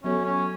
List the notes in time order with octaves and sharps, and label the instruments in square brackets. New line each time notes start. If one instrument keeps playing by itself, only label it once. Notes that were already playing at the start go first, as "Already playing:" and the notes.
[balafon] F#3 B3 F#4 A4 C#5 [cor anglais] C#4
[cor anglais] C#4